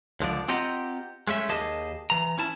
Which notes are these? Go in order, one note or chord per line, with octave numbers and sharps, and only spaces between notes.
C#2 D3 F3 D5
C4 F4 G4 D#5 F#5 A#5
G#3 A3 C#4 E5
D#2 D#3 G4 G#4 D#5 A5
E3 A#5
C#4 E4 A5